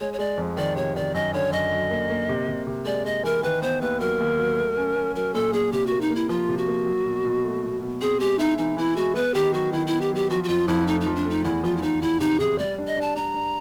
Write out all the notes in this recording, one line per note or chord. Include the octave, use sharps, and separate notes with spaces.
G#3 C#5
C#5
G#3 D5
F2
D#3 D5
C3 C#5
D#3 D5
F#2 D#5
D3 C#5
F#2 D#5
F#3
A#3
A#3
C3
C3
C3
G#3 D5
G#3 D#5
E3 A#4
D#3 B4
B3 C5
D#2 B4
F#3 A#4
D#2
F#3
A3
C#4
C#4
F#3 A#4
A#2 A4
A#2 G#4
C3 G4
F#4
A#3
D#4
A#3
E4
F3 F4
C3
F#4
A#3
F#3
B2
B2
A3
B2
B2
C4 G#4
G#3 G4
D#4 E4
E3 D#4
E3 E4
G#3 F#4
B3 B4
D#3 G4
F#3 F#4
D#3 E4
B3 E4
G4
F#3 G4
F3 F#4
F#4
F2 F4
F2 E4
A3 D#4
D#4
F3
D4
A3
D#4
E2 E4
F3 F4
E4
F3 D#4
E2 E4
C3 D#4
C3 G#4
G3 D5
D4
D#5
D4 A5
D4 A#5
D4